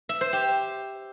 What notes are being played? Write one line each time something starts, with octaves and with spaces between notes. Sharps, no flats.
E5
C5
G4